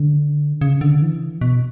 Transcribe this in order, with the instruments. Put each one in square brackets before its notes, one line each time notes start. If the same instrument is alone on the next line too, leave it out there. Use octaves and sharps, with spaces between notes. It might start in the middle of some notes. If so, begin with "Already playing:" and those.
Already playing: [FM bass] D3
C#3
D3
E3
B2